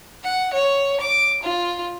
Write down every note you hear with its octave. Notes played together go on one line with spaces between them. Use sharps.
F#5
C#5
D6
F4